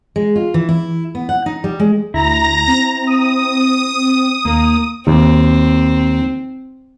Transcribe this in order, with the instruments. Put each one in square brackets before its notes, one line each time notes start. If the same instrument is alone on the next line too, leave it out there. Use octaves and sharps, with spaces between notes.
[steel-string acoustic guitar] G#3
F4
E3
E4
B3
F#5
D#4
G3
G#3
[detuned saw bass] D2 [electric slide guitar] E4 [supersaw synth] A#5 A#6
[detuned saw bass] C4
[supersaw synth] D#6
[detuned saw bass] D#2 [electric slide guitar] A#3 A#4
[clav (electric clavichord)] D#2 [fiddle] C4